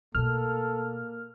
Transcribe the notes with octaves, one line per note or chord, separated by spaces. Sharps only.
B2 A3 A#3 A4 F6